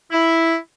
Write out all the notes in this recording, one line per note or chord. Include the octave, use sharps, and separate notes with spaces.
E4